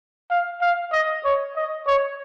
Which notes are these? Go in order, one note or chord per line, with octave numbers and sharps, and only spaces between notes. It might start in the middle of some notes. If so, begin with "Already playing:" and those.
F5
F5
D#5
C#5
D#5
C#5